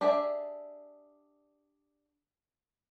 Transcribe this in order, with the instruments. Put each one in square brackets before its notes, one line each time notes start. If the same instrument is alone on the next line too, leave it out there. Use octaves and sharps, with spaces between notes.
[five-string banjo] D4 G4 G#4 D5 E5